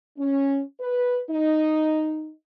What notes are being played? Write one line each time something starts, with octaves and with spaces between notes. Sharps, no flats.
C#4
B4
D#4